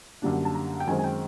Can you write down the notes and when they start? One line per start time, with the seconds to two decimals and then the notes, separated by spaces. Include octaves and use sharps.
0.22 F#2 D3 G3 A#3 D4
0.45 A5
0.55 A#5
0.80 G5
0.87 F#2 D#3 G#3 C4 G#5
0.99 G#5
1.04 G5